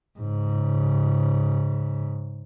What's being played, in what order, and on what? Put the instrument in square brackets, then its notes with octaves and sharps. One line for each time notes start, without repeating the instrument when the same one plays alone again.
[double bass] G#2 C#3